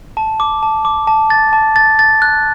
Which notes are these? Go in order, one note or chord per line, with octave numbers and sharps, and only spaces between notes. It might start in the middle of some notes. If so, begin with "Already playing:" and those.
A5
D6
A5
D6
A5
A6
A5
A6
A6
F#6